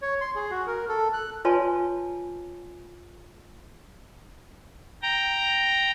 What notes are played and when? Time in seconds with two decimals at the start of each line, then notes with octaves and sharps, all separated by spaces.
0.02 C#5
0.21 C6
0.35 G#4
0.51 F#4
0.67 A#4
0.89 A4
1.13 F#6
1.45 F4 B4 C#5 G#5 A5 C6
5.02 G5 A#5